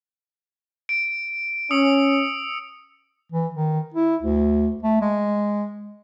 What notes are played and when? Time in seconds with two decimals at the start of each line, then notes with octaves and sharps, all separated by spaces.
0.89 D7
1.71 C#4 D#6 E6 C#7
3.32 E3
3.54 D#3
3.94 E4
4.22 D2
4.83 A3
5.01 G#3